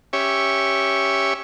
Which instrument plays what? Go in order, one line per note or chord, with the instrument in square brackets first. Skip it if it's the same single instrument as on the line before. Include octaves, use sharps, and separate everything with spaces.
[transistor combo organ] C#4 G4 C#5 E5